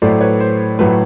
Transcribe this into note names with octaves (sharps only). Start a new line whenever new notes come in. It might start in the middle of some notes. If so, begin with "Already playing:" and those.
A2 F#3 A3 C5 D5
B4 C#5
C5
A2 F#3 A3 B4